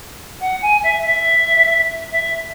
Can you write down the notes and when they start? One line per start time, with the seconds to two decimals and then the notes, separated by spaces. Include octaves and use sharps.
0.40 F#5
0.62 G#5
0.83 E5
1.05 E5
2.11 E5